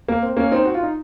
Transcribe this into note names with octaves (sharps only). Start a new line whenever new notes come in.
A#3
C4
A#3 C#4
C4 D#4
F#4
F4
D#4